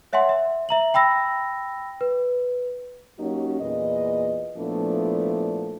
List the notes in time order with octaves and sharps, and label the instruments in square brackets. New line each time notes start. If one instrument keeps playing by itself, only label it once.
[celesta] C#5 E5 F#5 G#5 C6
E5
E5 A#5 F#7
G5 B5 E6 A#6
B4
[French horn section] F#3 A#3 C#4 D#4 F#4 G4
E2 A#2 G#4 B4 D#5
A#2 F3 A3 B3 D4 E4